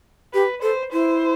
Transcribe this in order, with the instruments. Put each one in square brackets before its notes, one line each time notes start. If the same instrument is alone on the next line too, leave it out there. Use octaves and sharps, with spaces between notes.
[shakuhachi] G4 [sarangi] B4
[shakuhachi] A4 [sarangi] C5
[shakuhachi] E4 [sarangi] C5